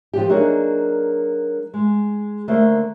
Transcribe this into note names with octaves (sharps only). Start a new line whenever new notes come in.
F3 F#4 G4
F#3 A#3 D4 D#4 G#4 A#4
G#3
D3 A3 A#3 C5